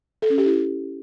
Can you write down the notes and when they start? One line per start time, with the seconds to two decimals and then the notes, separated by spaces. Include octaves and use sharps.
0.22 A4
0.30 C#4
0.38 G4
0.46 E4